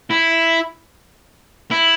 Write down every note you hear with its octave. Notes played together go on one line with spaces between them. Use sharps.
E4
E4